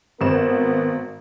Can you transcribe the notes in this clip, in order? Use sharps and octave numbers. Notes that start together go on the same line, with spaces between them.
G#1 B3 A#4 E7